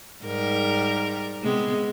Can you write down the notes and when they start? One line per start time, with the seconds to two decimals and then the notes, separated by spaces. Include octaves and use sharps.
0.24 G#2 G3 A#4
1.43 C3 G#3 B3